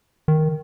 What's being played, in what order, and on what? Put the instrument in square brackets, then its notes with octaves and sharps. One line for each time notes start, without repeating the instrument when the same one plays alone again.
[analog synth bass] D#3